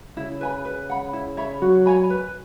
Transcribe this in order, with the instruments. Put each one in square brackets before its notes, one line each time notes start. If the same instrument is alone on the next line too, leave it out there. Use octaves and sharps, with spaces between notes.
[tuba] C#3 [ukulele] E4
[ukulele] B4 G#5 B5
B4
F#5 B5
E4
C#5 E5 B5
[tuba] F#3 [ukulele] F#4
[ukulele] C#5 G#5 B5
B4